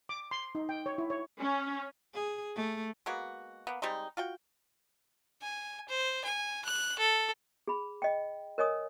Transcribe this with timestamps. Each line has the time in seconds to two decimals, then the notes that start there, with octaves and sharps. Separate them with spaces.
0.09 D6
0.31 C6
0.55 D#4
0.69 G5
0.86 C#5
0.98 E4
1.10 C#5
1.41 C#4
2.14 G#4
2.56 A3
3.06 G#3 A#3 B3 F#4
3.67 A#3 B3
3.82 G3 G#3 C4 D#4
4.17 F4 F#4 G5
5.42 G#5
5.88 C5
6.24 G#5
6.65 F#6
6.99 A4
7.68 G#4 B5
8.02 D#5 G5
8.58 A#4 C#5 D#5 G#5 D#6